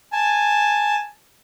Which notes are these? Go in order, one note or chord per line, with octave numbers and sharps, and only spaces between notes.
G#5 A5